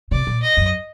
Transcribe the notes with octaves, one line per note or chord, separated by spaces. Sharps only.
C3 D5
A#2
D#5
F#2